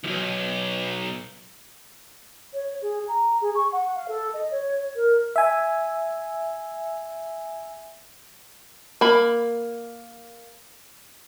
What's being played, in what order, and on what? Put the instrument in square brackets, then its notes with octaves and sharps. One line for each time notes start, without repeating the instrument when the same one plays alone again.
[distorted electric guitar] B1 E2
[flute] C#5
G#4
A#5
G#4
C#6
F#5
F5
A4
D#5
C#5
A#4
[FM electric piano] E5 G#5
[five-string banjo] A#3 B5